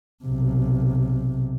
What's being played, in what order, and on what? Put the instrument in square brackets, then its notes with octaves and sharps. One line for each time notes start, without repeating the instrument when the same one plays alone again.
[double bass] B1 C3